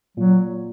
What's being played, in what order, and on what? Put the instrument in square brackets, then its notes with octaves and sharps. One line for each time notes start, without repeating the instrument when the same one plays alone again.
[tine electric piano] A#2 [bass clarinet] F#3